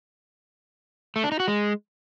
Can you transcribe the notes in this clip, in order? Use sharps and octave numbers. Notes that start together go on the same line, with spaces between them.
A3
D4
D#4
F#4
G#3